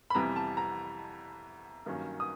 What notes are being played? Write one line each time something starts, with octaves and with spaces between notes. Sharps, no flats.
B5
F2 C3 E3 G3 B3 A#5
A5
A#5
G2 D#3 F#3 A#3 C#4
D#6